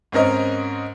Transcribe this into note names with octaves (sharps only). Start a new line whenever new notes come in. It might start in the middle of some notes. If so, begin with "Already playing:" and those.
G#2 C4 C#4 A#4 D#5